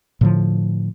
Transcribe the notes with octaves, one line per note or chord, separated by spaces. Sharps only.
A2 D3 F3